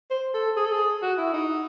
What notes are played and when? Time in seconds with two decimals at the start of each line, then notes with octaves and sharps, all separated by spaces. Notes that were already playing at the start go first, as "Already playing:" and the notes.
0.10 C5
0.34 A4
0.57 G#4
0.64 A4
0.72 G#4
1.02 F#4
1.18 E4
1.33 D#4